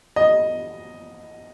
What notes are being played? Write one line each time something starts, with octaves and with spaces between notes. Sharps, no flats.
D#5